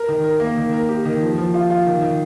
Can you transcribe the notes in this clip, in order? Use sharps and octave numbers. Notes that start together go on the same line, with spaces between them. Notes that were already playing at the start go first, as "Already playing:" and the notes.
Already playing: A#4
D#3
A#4
A#3
D#3
A#4
G4
D#3
F3
F3
F4
F4
D#3
D#3